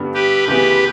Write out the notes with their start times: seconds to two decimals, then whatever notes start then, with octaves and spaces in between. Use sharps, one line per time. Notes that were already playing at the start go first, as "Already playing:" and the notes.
Already playing: G2 D3 G3 B3
0.14 G4 B4
0.48 D2 C#3 E3 B3 G4 B4